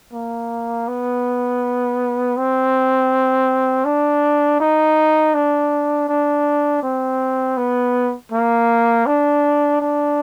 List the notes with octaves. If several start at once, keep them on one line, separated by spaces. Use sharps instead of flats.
A#3
B3
C4
D4
D#4
D4
D4
C4
B3
A#3
D4
D4